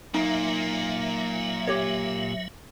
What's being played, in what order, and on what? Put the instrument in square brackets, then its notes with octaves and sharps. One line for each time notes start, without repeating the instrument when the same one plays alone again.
[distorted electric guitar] A#2 A#3 [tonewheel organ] F#3 E5 [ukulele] D#4
[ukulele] G4 C#5